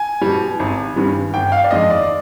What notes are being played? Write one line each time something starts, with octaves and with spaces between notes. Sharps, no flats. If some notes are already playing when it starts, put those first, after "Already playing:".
Already playing: G#5
B2 G3
G#1
G2 D#3 G3
G1 G5
F5
D5
F2 D#3 G#3 D#5
D5